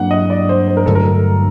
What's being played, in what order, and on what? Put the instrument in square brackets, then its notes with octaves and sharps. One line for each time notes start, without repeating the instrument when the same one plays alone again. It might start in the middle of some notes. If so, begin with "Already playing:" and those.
Already playing: [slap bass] G2 F#3 A#3 D4 [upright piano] F#5
[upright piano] D#5
D5
C5
C5
A#4
[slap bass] G2 D3 F#3 A3 [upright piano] A4
[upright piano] A#4